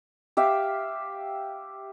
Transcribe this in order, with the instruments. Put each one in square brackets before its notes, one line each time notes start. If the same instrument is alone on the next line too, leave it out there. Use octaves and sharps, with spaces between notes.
[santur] G4 E5 F5 G5